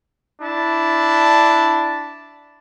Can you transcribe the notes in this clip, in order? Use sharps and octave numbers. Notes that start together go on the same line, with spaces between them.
D4 E4 A5